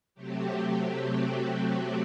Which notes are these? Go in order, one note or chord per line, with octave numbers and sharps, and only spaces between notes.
C3 F#3 A3 C4 G4
F#4
G4